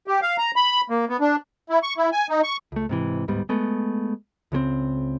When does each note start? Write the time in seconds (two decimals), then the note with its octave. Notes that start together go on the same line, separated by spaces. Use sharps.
0.07 G4
0.22 F5
0.38 A#5
0.56 B5
0.90 A#3
1.09 B3
1.21 D4
1.70 E4
1.83 C#6
1.98 E4
2.12 G#5
2.29 D#4
2.44 C#6
2.72 C#2 A3
2.89 G#2 C3 E3
3.28 D1 G#2 G3 B3
3.49 G#3 A3 B3
4.52 C#2 C#3 G#3 C4